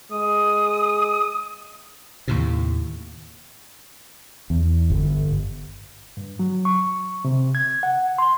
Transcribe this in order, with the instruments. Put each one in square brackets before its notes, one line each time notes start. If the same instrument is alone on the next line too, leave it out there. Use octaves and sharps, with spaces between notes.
[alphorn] G#3 [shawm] D#6
[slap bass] D#2 A2 C3
[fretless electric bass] E2
G1
[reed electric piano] G2
F#3
C#6
C3
G#6
F#5
C6